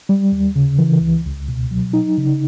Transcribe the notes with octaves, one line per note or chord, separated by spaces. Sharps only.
G3
D#2
C#3
E3
C#2
C#2
B2
F#3
D#4
C#3